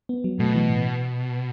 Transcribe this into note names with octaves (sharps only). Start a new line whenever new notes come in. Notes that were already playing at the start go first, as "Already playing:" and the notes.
B3
F#3
B2 A3
E3
A2